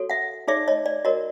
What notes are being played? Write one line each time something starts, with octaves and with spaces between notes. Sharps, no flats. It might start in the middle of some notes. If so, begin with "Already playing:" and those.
Already playing: F#4 A4 C#5
E5 F#5
D#4 G#4 C#5 D5 E5
C#5 D#5
D5
F#4 A#4 C#5 D#5